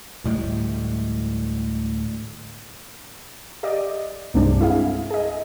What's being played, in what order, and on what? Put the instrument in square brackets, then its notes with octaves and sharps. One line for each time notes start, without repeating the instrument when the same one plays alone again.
[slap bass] D2 A2 G3 G#3
[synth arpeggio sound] G4 D5 D#5
C2 G2 G3 G#3 C4 D4
E4 G#4 F5
G#4 D#5